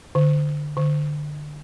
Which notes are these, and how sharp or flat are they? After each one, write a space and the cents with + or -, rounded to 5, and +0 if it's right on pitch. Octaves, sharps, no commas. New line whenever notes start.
D3 +15
D3 +20